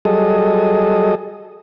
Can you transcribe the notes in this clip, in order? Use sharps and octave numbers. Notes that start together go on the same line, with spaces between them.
F#3 G3 G#4 A4 D#5